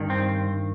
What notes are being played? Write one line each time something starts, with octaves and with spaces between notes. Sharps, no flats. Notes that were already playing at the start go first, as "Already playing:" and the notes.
Already playing: G2 D#3
C4